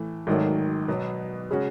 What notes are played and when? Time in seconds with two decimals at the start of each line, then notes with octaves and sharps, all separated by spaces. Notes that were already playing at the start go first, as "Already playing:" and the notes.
Already playing: A2 E3 A3
0.27 G#1 G#2 D#3 F#3 A3
0.88 B2 F#3 B3
1.51 C#3 G#3 C#4 F#4